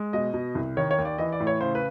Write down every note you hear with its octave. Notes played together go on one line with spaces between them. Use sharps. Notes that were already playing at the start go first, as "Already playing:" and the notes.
Already playing: G#3
B2 D#5
B2
C2
D#3 C#5
C#5
D#2
D5
E3 D#5
D5
A2
C#5
C#3 C5
B4